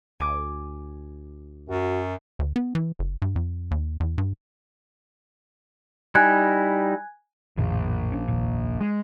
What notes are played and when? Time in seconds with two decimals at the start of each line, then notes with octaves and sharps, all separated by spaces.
0.20 D2 G#5 D6
1.69 F#2 F#4
2.39 D2
2.56 B3
2.75 E3
2.99 F#1
3.22 G2
3.36 F2
3.71 D#2
4.00 E2
4.18 G2
6.15 G3 D#4 E4 G#5 F#6 G#6
7.57 A#1 F2 A2 D#3
8.12 C#4 D4
8.28 F1 D#2 A#2
8.81 G#3